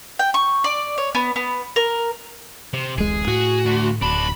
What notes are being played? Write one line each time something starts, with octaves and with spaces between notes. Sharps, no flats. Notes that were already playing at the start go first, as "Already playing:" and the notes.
G5
C#6
D5
C#5
B3
B3
A#4
C3
D1 A1 G#3 G#4
A2 F#4
D2
D1 D4 F#4 B5